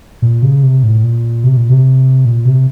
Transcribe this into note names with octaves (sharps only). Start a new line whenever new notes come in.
A#2
C#3
C3
A2
A#2
C3
A#2
C3
A#2
C3